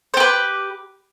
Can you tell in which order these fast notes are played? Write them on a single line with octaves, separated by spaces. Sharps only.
C5 G4 B4